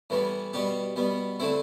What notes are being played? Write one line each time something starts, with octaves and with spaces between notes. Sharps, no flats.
A2 E3 G3 B3
B2 G3 B3 G4
B2 G3 B3
D3 A3 C4 E4